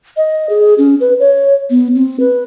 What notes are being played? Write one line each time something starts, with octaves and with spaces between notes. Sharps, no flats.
D#5
G#4
C#4
B4
C#5
B3
C4
B4